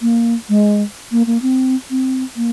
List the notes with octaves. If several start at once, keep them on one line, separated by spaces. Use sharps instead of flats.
A#3
G#3
A#3
A#3
C4
C4
A#3